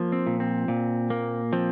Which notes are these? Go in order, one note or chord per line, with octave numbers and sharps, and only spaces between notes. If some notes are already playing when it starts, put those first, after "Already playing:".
Already playing: F3 A#3
C4
A#2
C4
A#2
A#3
F3 C4